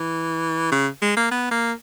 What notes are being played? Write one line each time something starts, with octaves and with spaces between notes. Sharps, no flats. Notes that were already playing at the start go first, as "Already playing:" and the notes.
Already playing: E3
C#3
G#3
A#3
B3
A#3